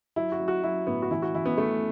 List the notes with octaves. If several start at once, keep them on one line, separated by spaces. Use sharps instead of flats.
F#3 E4
F#4
F#3
F#4
F#3 E4
A2 B3
F#4
E3 E4
F#4
E3 E4
B3
E3 A3